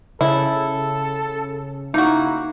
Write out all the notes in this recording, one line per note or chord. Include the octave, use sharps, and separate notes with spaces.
C#3 E4 A4
A#3 D#4 E4 F#4